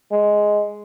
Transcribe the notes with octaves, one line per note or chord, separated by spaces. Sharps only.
G#3